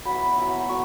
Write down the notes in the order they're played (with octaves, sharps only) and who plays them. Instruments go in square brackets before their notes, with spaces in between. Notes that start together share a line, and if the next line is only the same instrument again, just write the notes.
[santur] F#3 B3 E4 B5
F#3 B3 E4
F#3 B3 C#6